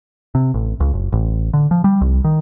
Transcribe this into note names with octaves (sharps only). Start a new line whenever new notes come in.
C3
A1
C#2
F#1
A1
D3
F3
G3
C2
D#3